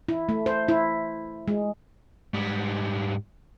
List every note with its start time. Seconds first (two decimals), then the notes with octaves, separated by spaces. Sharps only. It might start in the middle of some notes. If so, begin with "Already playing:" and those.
0.09 E4
0.29 A3
0.46 C5
0.68 E4
1.48 G#3
2.34 G#2 G3